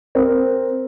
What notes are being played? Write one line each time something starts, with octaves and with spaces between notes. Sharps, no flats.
C4 A#4